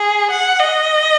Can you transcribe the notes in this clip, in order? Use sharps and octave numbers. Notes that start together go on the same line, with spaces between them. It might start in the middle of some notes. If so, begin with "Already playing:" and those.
Already playing: G#4
F#5
D#5